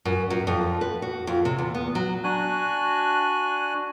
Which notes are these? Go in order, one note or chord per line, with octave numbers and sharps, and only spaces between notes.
F#2
F#2
F2
B4
F#4
F2
C3
E2
B3
F#3
D4 F#4 G#5 F#6